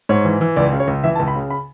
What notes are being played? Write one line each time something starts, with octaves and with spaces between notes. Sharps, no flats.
G#2 C#5
E3
E3
C#2 D5
C#3
C#5
C#2
E3 E5
A5
C#2
B5
C#3
B5